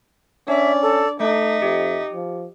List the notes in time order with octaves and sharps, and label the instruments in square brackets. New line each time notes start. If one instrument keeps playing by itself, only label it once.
[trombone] C#4 [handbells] D4 [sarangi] D5 [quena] E5
[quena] A4
[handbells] A3 D6 [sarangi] D#4 [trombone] A4 [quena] E5
[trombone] F2 [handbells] G4
[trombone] F3